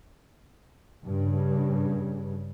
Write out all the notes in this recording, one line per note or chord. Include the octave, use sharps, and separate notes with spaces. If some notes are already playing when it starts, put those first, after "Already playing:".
G2 C#3